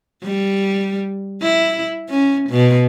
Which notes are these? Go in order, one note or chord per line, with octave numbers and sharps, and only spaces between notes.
G3
E4
C#4
B2